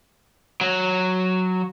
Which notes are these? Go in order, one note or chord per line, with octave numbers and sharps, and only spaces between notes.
F#3